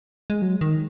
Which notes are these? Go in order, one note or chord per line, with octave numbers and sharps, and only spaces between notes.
G#3
F#3
D#3